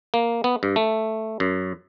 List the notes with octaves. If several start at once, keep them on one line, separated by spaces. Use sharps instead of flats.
A#3
B3
G2
A3
F#2